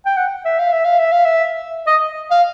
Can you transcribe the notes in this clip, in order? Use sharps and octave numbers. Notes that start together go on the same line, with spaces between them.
G5
F#5
E5
F5
E5
F5
E5
F5
E5
D#5
F5